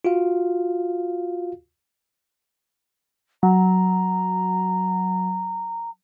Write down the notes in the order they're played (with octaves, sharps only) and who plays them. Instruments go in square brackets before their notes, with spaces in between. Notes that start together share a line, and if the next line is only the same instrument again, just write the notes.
[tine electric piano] F4 F#4 F5
[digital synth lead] F#3 [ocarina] A#5